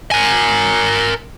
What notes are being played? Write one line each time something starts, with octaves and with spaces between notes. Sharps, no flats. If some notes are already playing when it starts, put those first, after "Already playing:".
A#4 G#5